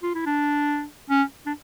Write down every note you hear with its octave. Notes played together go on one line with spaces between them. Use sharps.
F4
E4
D4
C#4
D4